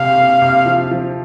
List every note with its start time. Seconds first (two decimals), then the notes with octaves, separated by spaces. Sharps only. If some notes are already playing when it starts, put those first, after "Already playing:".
Already playing: C3 G4 F5
0.17 C3
0.42 C3
0.66 F3
0.91 F3